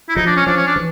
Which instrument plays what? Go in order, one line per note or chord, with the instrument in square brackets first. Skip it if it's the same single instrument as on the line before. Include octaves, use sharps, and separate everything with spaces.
[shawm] E4
[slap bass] F3 [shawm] D#4
[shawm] D4
C#4
[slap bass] F3 [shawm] D4
[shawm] C#4
D4
[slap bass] E3